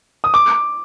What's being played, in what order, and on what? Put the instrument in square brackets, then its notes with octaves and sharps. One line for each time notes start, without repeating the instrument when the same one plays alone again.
[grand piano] D#6
D6